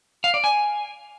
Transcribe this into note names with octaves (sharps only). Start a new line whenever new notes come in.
F5
D5
G#5